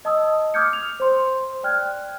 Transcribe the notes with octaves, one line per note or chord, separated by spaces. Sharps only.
D#5 A5 D#6 E6
D6 D#6 F6 G6 G#6 C#7
F7
C5 C6
D5 G5 F6 F#6 G#6